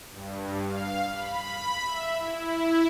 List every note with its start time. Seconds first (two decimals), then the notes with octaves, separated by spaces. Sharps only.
0.11 G2
0.66 F5
1.11 B5
1.82 E5
2.16 E4